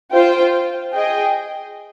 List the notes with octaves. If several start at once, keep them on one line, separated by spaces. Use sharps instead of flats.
F4 C5 G5
G#4 D#5 G5